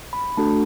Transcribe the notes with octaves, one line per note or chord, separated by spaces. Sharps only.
B5
A3 D4 F#4 A4 A5